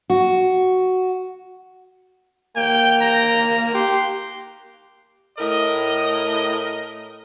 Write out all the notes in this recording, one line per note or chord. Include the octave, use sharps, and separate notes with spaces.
F#4
A#3 G5
A#5
G4 C6
A2 A#4 D#5